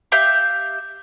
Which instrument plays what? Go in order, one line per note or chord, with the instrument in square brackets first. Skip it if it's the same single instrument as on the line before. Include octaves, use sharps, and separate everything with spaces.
[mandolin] G4 E5 F5 G6